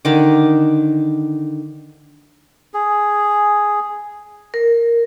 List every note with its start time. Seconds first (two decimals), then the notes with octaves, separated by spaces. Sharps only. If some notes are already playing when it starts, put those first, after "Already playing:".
0.05 D3 D#3 D6
2.74 G#4
4.54 A#4